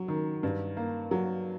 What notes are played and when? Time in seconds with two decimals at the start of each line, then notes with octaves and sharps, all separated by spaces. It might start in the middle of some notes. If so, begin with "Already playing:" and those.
Already playing: F#3
0.08 D#3
0.43 G2
0.77 A#3
1.11 F#3